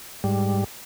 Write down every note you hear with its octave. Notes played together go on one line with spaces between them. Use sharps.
G#2 G3